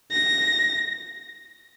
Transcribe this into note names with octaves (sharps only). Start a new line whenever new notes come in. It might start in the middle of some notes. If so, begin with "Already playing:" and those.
A#6